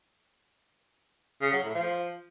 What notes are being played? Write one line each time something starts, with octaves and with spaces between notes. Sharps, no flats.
C#3
F#3
A2
F3